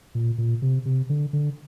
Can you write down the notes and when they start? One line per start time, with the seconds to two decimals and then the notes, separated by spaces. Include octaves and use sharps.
0.15 A#2
0.38 A#2
0.62 C3
0.85 C3
1.10 D3
1.33 D3